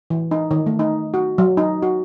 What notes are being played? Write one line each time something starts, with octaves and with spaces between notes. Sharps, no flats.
E3
D#4
D#3
A3
D#4
F#4
F#3
D#4
F#4